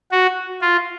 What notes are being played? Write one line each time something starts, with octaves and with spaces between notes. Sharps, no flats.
F#4
F4